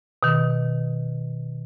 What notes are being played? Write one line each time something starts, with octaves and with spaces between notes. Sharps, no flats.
B2 D#3